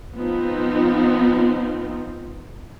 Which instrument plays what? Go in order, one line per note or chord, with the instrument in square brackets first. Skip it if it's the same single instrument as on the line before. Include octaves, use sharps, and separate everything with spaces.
[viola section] F3 B3 C4 D#4 F4